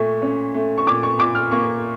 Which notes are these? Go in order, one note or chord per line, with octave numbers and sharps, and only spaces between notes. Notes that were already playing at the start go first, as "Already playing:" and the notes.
Already playing: A#2 A3 C#6
C#4
A3
C#6
A#2 D6
C#6
A#2 D6
F6
A#3 C#6